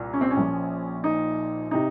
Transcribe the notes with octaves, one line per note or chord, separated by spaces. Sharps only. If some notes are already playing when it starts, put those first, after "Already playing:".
Already playing: C2 A#2
C#4
C4
C#4
A#1 A#2 F3
D#4
C3 D#4